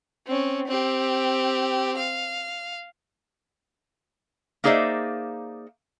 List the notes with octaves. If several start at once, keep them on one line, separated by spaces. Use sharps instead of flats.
C4 C#4
C4 G4
F5
A#3 D#4 G#4 C5 D5 E5